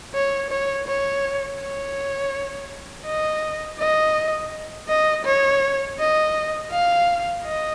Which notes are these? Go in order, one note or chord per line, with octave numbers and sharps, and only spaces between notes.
C#5
C#5
C#5
C#5
D#5
D#5
D#5
C#5
D#5
F5
D#5